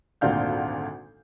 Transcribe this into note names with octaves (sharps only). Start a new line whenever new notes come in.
G#1 D2 A#2 D4 F5 G6